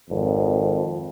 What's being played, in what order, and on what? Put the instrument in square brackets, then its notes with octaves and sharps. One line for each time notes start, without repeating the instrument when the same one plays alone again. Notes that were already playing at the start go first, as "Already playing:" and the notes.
[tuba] G#1 [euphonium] F2